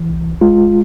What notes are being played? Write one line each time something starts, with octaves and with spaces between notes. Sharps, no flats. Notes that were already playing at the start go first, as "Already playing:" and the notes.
Already playing: E3
C2
G#3 F4